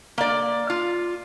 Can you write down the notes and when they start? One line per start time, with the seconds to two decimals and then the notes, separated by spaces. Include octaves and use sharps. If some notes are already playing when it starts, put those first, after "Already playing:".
0.18 A#3 D5
0.70 F4